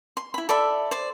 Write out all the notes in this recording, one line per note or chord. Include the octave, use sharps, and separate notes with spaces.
C6
E4 B5
A4 D5 E5 B5
C5 D5